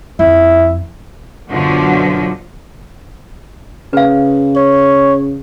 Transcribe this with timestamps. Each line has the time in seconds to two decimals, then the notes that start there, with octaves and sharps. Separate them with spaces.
0.19 F2 E4
1.50 F#2 B2 D3 F3 F#3
3.93 C#3 B4 F5
4.56 C#5